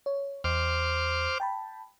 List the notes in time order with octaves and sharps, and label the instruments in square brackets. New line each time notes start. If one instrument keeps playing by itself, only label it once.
[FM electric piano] C#5
[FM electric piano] E2 [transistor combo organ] C5 D6 F6
[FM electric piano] G5 A5 B5